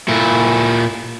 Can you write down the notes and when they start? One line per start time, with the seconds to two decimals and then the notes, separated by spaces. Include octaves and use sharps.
0.08 A#2 E4